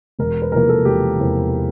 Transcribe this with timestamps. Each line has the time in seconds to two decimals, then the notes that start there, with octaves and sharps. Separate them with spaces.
0.19 E1 A#4
0.42 B4
0.52 E2 C3 F3 A#3 A#4
0.69 A4
0.85 E1 G4
1.19 E2 C3 F3 A#3